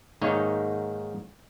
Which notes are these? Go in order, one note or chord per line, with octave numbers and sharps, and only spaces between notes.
G#2 D#3 A#3 D#4 C#5 D#5